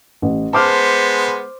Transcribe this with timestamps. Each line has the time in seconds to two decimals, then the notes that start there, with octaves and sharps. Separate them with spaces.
0.22 A1
0.53 G#3 B3 C5 A5 D6 F6